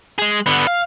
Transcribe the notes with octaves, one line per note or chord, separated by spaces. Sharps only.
G#3 G#4
D3 B3
F5